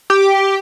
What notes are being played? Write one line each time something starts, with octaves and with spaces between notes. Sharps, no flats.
G4